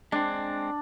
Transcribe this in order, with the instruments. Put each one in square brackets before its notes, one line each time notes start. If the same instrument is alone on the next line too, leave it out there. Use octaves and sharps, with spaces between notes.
[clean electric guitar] G#3 C4 [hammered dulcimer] D4